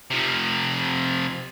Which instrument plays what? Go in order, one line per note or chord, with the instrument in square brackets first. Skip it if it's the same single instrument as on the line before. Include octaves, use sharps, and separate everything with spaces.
[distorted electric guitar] C3 F3